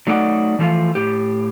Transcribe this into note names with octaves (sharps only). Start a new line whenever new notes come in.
F#3 A3 D#4 D5 F#5
E3 F3 A3 F4
A2 G4